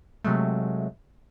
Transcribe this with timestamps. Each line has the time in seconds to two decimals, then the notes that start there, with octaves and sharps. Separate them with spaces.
0.24 C3 F#3 G#3 A3